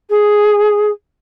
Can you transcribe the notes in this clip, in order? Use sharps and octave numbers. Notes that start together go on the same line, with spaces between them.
G#4